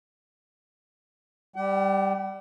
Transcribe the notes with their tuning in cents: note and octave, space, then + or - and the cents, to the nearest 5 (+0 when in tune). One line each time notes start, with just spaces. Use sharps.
G3 +0 F#5 +45